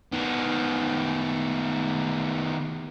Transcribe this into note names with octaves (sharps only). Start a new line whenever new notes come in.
D#3 B3